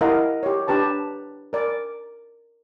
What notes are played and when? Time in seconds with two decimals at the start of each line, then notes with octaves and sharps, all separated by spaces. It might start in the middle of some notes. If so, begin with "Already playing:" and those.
0.01 E4 G4 A#4 D#5 F5 F#5
0.43 G4 C#5
0.67 D4 G4 B4 A5 A#5
1.53 A#4 D5